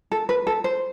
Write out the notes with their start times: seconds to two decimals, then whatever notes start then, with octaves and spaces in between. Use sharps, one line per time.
0.12 A4
0.29 B4
0.47 A4
0.64 C5